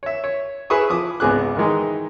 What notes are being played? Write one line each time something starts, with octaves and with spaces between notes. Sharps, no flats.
C#5 E5
C#5
E4 G#4 B4 E5 C#6 D#6
F3 D6 D#6
G#1 C#2 B3 G#4 D6 F#6
D#3 E3 G#3 D#4